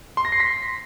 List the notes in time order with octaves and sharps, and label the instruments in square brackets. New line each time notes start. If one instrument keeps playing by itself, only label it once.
[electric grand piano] C6
A#6
C7
B6